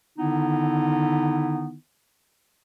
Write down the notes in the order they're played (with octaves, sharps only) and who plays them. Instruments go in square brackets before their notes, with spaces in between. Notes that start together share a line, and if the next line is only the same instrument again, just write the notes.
[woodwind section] D3 D#3 B3 D#4 E4